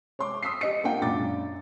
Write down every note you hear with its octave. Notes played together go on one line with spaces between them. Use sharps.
C#5 C6 D6
D#6 E6 B6 C7
G4 D#5 C#7
A#3 D4 F4 F#5 G5
F#2 A#2 D4 D6 A6
F#2